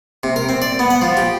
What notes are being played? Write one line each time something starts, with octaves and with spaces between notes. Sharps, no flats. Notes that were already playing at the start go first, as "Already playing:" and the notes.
C3
A#4
C4
D5
B3
F#5
F3
G4